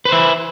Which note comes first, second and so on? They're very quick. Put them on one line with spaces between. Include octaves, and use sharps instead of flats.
B4 C5 E4